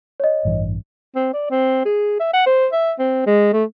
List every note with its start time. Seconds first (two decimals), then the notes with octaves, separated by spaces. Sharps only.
0.20 C#5 D#5
0.45 A1 G2 E3
1.15 C4
1.33 D5
1.50 C4
1.85 G#4
2.20 E5
2.33 F#5
2.46 C5
2.72 E5
2.99 C4
3.26 G#3
3.53 A3